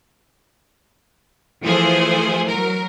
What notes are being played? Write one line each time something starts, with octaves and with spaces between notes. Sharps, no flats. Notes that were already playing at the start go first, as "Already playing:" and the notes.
E3 F3 A3 G#4 C5
F#3 A#4